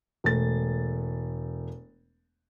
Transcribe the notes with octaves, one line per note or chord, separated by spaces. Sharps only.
E1 A3 A6